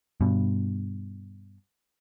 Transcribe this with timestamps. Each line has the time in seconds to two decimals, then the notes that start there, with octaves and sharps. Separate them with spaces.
0.21 G2 B2